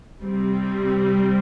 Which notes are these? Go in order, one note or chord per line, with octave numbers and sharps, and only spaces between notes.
C3 G3 C4